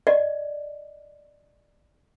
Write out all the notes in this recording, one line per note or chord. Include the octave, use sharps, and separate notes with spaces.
D5 D#5